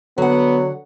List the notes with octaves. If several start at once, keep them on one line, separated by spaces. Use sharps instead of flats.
D3 F#3 B3 F#5